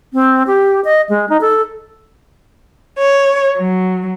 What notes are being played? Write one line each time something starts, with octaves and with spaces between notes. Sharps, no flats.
C4
G4
D#5
G#3
D#4
A4
C#5
F#3